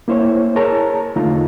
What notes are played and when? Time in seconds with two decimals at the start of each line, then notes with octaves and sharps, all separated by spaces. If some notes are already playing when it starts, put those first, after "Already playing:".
0.08 A#3 E4 C5 C#5
0.56 G#4 A#4 C#5 A5 A#5
1.16 E2 D3 A3 D#4 F4 A#5